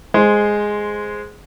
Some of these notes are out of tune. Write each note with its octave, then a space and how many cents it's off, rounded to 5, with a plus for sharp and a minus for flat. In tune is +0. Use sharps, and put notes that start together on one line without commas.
G#3 +0 C5 +0